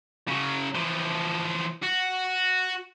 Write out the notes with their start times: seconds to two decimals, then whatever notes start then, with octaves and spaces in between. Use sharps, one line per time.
0.28 C#3 F#3
0.75 E3 F3
1.84 F#4